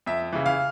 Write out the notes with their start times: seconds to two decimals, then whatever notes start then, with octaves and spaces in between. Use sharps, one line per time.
0.06 F2 E5
0.32 C#3 E3
0.46 F5